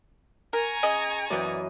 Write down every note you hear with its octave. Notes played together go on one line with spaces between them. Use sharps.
A#4 G#5 A#5 C#6
C#3 G#4 D#5
F#2 E3 B3 D5 D#5